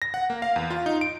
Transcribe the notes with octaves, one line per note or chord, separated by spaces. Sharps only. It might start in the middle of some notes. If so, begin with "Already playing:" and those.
A#6
F#5
A#3
F5
E2
F4
D#4
D7